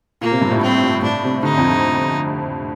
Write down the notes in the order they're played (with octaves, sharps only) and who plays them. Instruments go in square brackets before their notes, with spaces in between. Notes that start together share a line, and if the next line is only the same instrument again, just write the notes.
[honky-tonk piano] A#2 [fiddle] A#3
[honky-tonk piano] C3
G2
A2
[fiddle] C4
[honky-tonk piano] A2 [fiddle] D4
[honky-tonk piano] C3
[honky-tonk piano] D3 [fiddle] D#4
[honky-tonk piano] F2